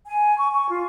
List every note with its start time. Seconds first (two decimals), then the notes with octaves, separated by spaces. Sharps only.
0.06 G#5
0.38 C#6
0.52 C#6
0.69 F4